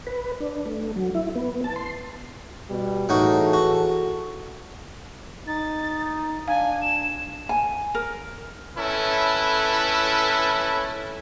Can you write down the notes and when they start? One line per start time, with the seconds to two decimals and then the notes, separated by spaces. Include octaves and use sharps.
0.07 B4
0.40 D4
0.66 A3
0.96 F#3
1.15 E4
1.36 B3
1.64 A5
1.76 C6
2.70 B2 G3
3.09 A2 E3 D#4 F#4 G#4 A4
3.53 F#4
5.47 D#4 A6
6.48 D4 F5 G#5
6.82 E7
7.49 G#5
7.95 A#4
8.77 C#4 E4 A4 B4